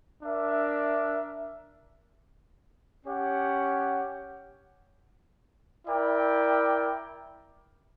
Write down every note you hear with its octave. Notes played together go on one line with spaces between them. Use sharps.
D4 A#4 E5
C#4 G4 C#5 F#5
E4 A#4 D5 G5